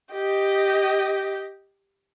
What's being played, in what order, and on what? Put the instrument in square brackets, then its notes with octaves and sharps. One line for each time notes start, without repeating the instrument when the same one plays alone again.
[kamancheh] G4 D#5